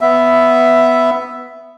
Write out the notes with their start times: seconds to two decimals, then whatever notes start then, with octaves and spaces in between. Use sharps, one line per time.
0.01 B3 E5